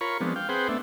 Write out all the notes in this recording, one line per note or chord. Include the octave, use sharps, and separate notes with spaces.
F4 A#4 C#5 B5 C#6
F3 G#3 B3 C4 D4
F5 G5
C4 G#4 B4 C5 F#5 G5
A3 B3 D4 E5